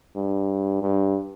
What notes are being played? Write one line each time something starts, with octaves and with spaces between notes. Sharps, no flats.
G2
G2